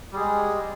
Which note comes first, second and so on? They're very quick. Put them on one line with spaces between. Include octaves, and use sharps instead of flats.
G3 G#4 G#3